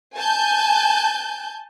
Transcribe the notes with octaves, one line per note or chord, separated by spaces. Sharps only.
G#5 A5 G6